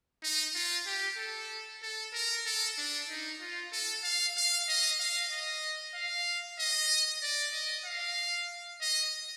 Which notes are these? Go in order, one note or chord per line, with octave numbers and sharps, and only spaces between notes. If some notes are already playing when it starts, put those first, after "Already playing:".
D#4
F4
G4
A4
A4
A#4
A4
D4
D#4
F4
A4
F5
F5
D#5
F5
D#5
F5
D#5
D5
D#5
F5
D#5